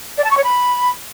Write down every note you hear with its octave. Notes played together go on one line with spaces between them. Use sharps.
D5
A5
C#6
C#5
B5